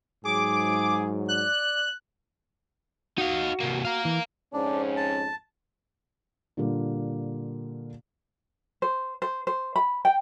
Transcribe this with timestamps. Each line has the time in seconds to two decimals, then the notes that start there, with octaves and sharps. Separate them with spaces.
0.25 G#2 F#3 G#4 D6
1.28 D5 F#6
3.18 D#4 F#4 F5
3.60 C3 A#3
3.85 A#4 F5
4.05 E3
4.53 F2 G#2 C#4 D4
4.97 A5
6.57 A#2 D3 G3 A#3
8.82 C5
9.22 C5
9.47 C5
9.76 B5
10.05 G5